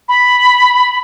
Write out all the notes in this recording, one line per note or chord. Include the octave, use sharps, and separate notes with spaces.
B5